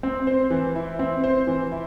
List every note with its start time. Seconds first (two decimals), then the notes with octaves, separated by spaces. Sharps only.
0.03 C4
0.27 C5
0.50 E3
0.75 E4
0.99 C4
1.24 C5
1.47 E3
1.72 E4